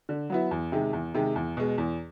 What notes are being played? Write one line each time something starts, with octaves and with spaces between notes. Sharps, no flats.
D3
F#3 B3 E4
E2
C3 D#3 G#3
E2
C3 D#3 G#3
E2
B2 G#3
E2